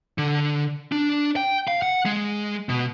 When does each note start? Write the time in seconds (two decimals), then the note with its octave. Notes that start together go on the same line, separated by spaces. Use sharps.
0.18 D3
0.92 D4
1.36 G5
1.68 F5
1.83 F#5
2.05 G#3
2.69 B2